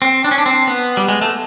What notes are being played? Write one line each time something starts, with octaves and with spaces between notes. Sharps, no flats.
C4
D4
C#4
D4
C4
B3
G3
G#3
A3